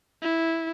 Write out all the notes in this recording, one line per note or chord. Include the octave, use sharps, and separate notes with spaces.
E4